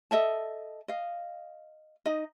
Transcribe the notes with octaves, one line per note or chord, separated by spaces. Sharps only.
A4 D#5 E5 A5
D#5 F5
D#4 D#5